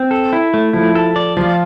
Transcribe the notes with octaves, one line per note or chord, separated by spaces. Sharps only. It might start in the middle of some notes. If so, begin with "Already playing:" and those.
Already playing: C4
A4
E4
A3
F3 E4
A4
D5
F3 F4